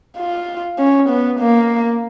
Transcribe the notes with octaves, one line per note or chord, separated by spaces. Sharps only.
F4
C#4
B3
A#3